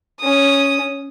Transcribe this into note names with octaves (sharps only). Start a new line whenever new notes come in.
C#4 D#6